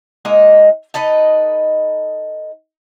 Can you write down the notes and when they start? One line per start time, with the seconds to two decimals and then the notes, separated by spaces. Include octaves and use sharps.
0.25 G#3 A#3 D#4 D#5
0.94 D#4 A4 B4 D#5